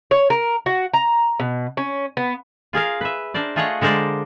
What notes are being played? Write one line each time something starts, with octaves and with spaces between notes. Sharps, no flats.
C#5
A#4
F#4
A#5
B2
C#4
B3
F4 G#4 A#4 F5
B4 E5
D4 A#4 C5 D5
A3 F4 G#4 C#5 D#5 F#5
D3 G#3 A#4 C5 D5